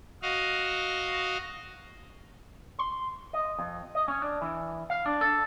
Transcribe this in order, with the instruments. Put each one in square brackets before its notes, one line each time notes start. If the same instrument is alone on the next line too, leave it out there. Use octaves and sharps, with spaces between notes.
[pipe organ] F#4 D#5 F5
[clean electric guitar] C6
D#5
F2
D#5
C#4
D4
E3
F5
D4
A4